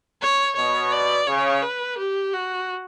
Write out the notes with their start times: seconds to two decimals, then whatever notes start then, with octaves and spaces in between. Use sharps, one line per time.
0.22 C#5
0.56 B2 C#5
0.92 D5
1.27 C#3 C#5
1.63 B4
1.98 G4
2.33 F#4